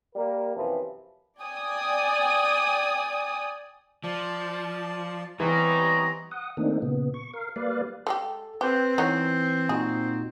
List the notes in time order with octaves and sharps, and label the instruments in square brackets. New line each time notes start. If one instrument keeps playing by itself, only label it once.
[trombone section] G3 A#3 A#4
F#2 C3 E3 F3
[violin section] D5 G5 G#5 D#6
[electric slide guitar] F3 [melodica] D5 A5
[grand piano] E3 [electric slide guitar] G3 [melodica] B3 C4 [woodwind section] C#5 D#5 A#5
[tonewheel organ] F#5 D#6
D#3 A3 A#3 C4 D4 D#4
A#2 C#3 B3
C#6
A#4 F5
G3 A#3 B4 D5 F5
[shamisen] G3 G#3 G4 [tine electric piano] A4
[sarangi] C4 [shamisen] G4 [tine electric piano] B4 C5
[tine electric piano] E3 [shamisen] B3 D#4 C#5
[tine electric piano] A#2 D#4 F#4 [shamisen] G#4